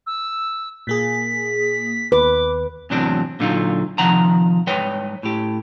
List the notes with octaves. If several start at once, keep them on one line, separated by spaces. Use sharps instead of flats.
E6
A#2 A#3 G#4 B6
D#2 B4 D6
E2 A2 C3 F#3 C4 D4
A#2 D3 F#3 D#4 F4
C3 D#3 F3 F#5 A#5
G#2 G3 B4 C#5 G5
A2 G4